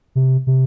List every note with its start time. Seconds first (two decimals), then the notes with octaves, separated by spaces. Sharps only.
0.15 C3
0.47 C3